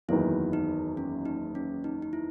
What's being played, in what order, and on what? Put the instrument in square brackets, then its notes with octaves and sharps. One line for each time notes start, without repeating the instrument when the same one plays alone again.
[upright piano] F#1 E2 D#3 F#3 B3 [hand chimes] E4
[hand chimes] D#4
C#4
D#4
C#4
D#4
D#4
E4